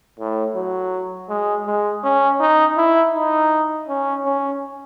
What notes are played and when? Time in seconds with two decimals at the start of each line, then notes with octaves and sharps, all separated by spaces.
0.19 A2
0.55 F#3
1.29 G#3
1.66 G#3
2.04 C#4
2.40 D#4
2.77 E4
3.14 D#4
3.89 C#4
4.25 C#4